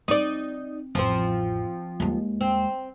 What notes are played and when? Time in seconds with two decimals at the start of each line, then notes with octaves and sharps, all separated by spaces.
0.08 C4 D#4 D5
0.95 A1 F2 F3 C4
2.00 D#2 G#3
2.41 C4